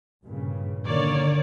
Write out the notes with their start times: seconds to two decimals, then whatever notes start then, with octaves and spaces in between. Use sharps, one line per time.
0.24 G2 A#2 C#3
0.86 D3 D#3 A#3 C#5 D5